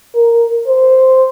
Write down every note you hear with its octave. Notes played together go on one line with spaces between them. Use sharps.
A#4
C5